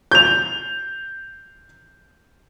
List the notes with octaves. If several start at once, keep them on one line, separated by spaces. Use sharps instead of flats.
G6 F7